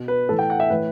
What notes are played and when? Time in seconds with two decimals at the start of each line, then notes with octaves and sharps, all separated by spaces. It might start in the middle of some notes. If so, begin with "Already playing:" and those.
Already playing: B2
0.08 B4
0.29 A2 E3 A4
0.39 G5
0.50 F#5
0.60 E5
0.70 A2 E3 B4